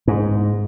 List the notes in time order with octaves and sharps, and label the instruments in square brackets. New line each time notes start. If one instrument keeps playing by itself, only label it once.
[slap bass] G#2